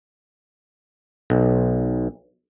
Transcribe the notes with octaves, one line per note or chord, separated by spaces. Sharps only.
B1